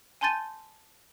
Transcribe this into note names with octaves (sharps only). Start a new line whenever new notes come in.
G#5 A5 C6 G6 A6 D#7